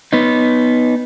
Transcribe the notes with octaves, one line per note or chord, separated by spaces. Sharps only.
B3 D#4